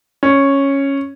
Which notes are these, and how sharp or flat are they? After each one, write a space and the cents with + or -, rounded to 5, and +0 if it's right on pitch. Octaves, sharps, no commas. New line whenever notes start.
C#4 -5